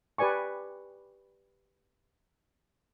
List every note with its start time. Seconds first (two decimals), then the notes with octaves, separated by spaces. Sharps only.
0.18 G4 B4 D5 G#5 C#6